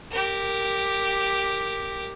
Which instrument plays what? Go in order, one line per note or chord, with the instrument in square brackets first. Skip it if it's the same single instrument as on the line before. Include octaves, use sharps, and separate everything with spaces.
[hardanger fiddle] G4 A#4